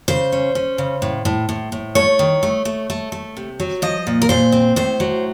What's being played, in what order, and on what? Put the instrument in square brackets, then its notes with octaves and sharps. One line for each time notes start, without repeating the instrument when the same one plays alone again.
[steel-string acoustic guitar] C#3 C5
C#4
C#4
C#3
A2
A2
A2
A2
A3 C#5
D#3
A3
A3
A3
A3
C3
F#3
F3 D#5
A#2
A#4
A#2 C5
C4
A2 C5
F#3